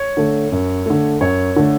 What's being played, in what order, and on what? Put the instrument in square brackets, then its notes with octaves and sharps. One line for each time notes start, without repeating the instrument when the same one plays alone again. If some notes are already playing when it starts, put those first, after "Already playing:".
Already playing: [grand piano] C#5
D3 A3
F#2
D3 A3
F#2 C#5
D3 A3